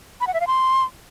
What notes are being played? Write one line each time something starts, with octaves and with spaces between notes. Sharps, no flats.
B5
F#5
E5
F5
C6